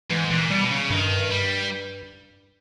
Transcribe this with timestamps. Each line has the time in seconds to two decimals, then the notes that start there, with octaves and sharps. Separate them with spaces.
0.10 G#2 E3
0.30 A#2 E3
0.50 B2 G3
0.71 C#3
0.90 G2 D#3
1.31 G3